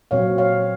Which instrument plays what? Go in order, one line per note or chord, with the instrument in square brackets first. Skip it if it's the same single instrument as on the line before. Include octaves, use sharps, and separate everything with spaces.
[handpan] A#2 F#3 C4 C#5 F5
C#5 F5